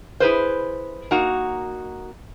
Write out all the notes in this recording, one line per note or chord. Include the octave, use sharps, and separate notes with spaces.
E4 G#4 B4 C5
A#3 D#4 F#4